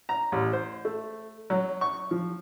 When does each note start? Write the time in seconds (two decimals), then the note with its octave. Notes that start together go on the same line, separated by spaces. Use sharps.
0.09 A#5
0.32 A1
0.53 C5
0.85 A3
1.50 F#3
1.81 C#6
2.11 F3